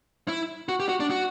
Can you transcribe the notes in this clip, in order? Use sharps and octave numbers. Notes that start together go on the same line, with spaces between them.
E4
F#4
G4
F#4
D4
F#4